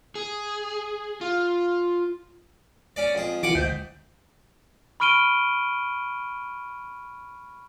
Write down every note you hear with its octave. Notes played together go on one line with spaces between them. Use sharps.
G#4
F4
C#4 D5
F2 G#4
E3 F3 F4 F#5 G#5 D6
D2 G#2 G5
B5 C#6 F6 D7 D#7 G7